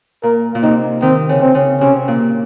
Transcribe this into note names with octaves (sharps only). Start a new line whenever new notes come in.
A#2 A#4
A#2
C3 D#4
D#3 C4
C#3
C4
C#3
C3 C#4
A#2